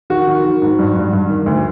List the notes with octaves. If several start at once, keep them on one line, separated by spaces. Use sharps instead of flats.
D#3 F#4
D#3
D#3
G#2
G2
G2
G2
D#3
D2